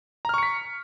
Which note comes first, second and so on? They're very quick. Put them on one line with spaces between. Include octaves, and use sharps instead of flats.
A#5 F6 C#6 C#7 B6